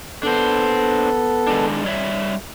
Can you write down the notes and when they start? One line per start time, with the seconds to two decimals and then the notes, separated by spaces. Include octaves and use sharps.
0.23 B3 D4 A4 C5
1.47 D#3 G#3 D4
1.84 G3 C#5 E5